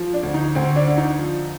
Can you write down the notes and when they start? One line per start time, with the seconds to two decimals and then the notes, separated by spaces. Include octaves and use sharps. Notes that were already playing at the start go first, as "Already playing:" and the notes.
Already playing: F3
0.14 D4
0.23 D2
0.34 D#4
0.55 D2 C4
0.76 D4
0.87 D3
0.97 D#4
1.18 F3